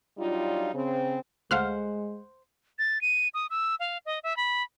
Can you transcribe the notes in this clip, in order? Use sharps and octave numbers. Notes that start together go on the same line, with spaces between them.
F#3 G3 D4 D#4 F4
C#3 C4
D2 G#3 A3 C5 F5 F#5 F6 F#6
A6
D#7
D#6
E6
F5
D#5
E5
B5